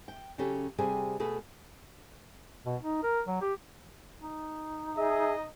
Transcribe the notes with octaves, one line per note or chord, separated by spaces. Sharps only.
G5
C#3 F#3 C#4 G4 A4
C3 G3 G#4 A4 C5 G#5
B2 A3 G#4 A4 B4
B2
D#4
A#4
F#3
G4
D#4
G#4 D#5 E5